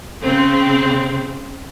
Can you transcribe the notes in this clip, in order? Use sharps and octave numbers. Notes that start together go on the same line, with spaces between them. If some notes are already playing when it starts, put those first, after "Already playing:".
C#3 C4